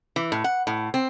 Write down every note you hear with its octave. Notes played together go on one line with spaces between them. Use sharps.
E3
A2
F#5
A2
C4